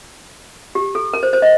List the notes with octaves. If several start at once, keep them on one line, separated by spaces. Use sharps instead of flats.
G4
A4
A#4
C5
C5
D#5